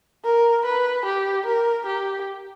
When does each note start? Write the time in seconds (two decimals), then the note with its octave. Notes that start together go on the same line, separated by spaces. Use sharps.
0.24 A#4
0.66 B4
1.06 G4
1.46 A#4
1.86 G4